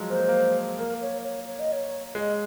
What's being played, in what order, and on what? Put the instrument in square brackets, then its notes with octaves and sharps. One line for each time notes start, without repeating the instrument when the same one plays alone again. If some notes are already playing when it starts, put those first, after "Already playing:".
Already playing: [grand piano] F3 F#3 G#3
[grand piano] A#3 [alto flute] C5
[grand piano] G#3
A#3
[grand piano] A#3 [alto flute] A#4
[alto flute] C#5
C#5
C#5
D#5
C#5
[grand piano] G#3 [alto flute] D#5